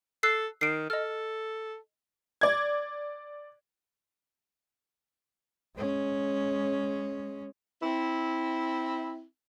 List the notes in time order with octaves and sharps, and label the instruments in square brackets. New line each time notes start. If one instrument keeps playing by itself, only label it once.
[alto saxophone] A4 [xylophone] E6 F#6 C7
[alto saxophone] D#3 [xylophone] C7 D7
[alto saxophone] A4 [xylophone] D#5 F6
[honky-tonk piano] D5 G#6
[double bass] G#3 C#4
[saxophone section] C4 E4